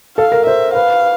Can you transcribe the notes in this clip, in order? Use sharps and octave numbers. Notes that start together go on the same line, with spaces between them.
A4 F5
A#4
C5 E5
B4 F5